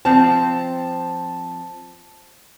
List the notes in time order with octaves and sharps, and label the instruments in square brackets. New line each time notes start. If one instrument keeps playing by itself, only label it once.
[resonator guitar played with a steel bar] F3 C4 [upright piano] A5